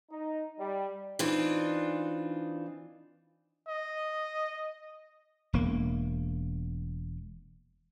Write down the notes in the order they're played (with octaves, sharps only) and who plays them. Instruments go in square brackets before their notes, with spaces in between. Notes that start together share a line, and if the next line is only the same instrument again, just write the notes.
[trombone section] D#4
G3
[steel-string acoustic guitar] E3 C4 D4 D#4 F4
[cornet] D#5
[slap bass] E1 A#3